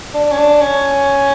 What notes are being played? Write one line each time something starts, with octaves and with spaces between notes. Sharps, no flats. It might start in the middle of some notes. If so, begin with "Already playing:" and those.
D4
C#4
D4
C#4